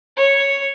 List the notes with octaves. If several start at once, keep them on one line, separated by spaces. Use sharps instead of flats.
C#5